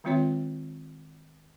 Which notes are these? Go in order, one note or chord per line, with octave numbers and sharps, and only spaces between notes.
D#3 G#3 C4 F4 C#5 E5